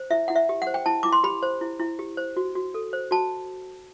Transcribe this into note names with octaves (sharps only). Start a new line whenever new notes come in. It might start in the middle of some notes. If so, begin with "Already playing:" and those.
Already playing: C5
E4 E5
E4 F#5
E5
G4
F#5
C5
G5
E4 A5
E4 D6
C6
G4 B5
C5
E4
E4
G4
C5
F#4
F#4
A4
C5
F#4 A5